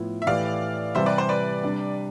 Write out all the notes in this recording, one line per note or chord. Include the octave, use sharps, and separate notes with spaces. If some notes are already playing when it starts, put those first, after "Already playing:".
Already playing: A2 F3 B3 E4
E5
A2 E3 A3 E4 G4 D5 F5
C3 E3 G3 C5 E5
B4 D5
C5
B4 D5
C3 G3 D4